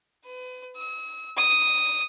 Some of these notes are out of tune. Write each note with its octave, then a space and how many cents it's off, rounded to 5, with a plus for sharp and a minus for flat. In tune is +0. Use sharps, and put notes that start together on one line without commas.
B4 +35
E6 -45
D#6 +0